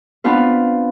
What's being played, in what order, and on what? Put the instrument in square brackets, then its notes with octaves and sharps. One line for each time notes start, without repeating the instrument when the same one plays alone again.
[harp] B3 C4 D4 F4 B4